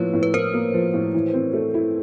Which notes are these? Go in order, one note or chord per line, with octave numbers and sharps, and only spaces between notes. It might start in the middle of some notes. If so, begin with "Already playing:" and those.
Already playing: A2 F3 A#3 B4 C#5
A2
B4
A2 A#4 C5
A#3
F3
A2
E3
C4
A3
E4